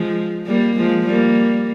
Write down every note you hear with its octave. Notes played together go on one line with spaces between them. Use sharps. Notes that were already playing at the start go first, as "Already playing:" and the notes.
Already playing: F3 G#3
G3 A#3
F3 G#3
G3 A#3